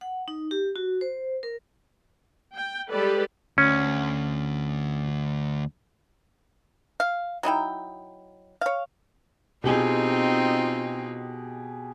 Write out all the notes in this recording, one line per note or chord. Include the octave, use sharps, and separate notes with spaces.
F#5
D#4
G4
F#4
C5
A#4
G5
G3 G#3 G4 A4 B4 D5
D2 C#4
F5
F#3 D#4 E4 G5
C#5 F5
B2 C4 D#4 F4 G4 G#4